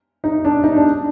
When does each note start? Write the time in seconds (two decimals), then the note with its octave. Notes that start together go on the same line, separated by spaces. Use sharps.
0.24 D#4
0.45 D4
0.64 D#4
0.76 D4